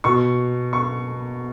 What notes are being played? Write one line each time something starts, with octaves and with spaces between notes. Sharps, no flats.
B2 C#6
C#6